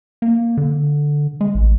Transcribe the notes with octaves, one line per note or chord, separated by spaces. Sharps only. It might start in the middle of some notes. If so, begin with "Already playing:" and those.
A#3
D3
G#3
A1